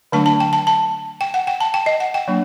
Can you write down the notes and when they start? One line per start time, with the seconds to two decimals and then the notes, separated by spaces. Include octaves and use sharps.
0.12 D3 F#3 A3 D4 A5
0.26 A5
0.40 G5
0.53 A5
0.67 A5
1.21 G5
1.34 F#5
1.47 G5
1.60 A5
1.74 G5
1.86 D#5
2.00 F#5
2.14 G5
2.28 F#3 A#3 D4